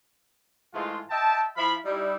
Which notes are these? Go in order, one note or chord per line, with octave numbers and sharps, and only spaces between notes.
G#2 E3 G#3 A3 F4
D#5 E5 G5 A5
F3 E4 F5 B5
G3 D#4 E4